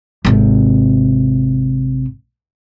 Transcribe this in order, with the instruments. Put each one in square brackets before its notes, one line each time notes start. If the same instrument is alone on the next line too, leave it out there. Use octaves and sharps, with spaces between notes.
[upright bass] G#1 C3